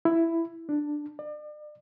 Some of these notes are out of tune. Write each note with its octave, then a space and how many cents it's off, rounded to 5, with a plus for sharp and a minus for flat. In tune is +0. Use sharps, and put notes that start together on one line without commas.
E4 +10
D4 +10
D5 +40